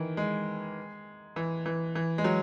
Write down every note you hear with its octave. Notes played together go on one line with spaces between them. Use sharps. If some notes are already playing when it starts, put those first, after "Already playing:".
Already playing: D#3 E3
G#3
E3
E3
E3
G#3
F#3